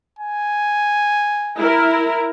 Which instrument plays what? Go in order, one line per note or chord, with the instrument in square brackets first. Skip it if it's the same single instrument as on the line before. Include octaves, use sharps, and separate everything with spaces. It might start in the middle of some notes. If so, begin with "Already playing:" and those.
[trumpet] G#5
[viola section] E4 A#4